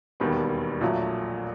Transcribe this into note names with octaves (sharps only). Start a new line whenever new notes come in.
E1 D#2 D#3 G3 B3
A#1 A#2 F#3 A3